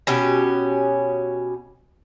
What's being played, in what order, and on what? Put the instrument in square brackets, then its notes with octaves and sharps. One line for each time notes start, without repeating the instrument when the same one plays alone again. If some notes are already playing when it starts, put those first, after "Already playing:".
[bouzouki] B2 C#4 G4